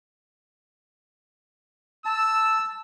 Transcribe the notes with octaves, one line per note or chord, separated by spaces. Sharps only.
A5 E6